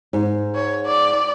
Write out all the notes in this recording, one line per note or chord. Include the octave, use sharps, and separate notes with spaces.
G#2
C#5
D5